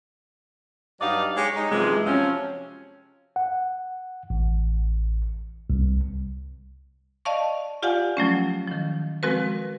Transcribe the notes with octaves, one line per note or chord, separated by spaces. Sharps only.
G2 F#3 D#4 D5 D#5 F5
G#3 G4 C#5
D#4
F#2 C3 E3 F3 G#3
C3 F3 F#3 C4 C#4
F#5
A1
C2
D5 D#5 F5 A5 C#6
F4 G4 D5 F5 F#5 G#5
F3 F#3 A3 C#4
D#3 F3
F3 G#3 C4 F#4 A#4 B4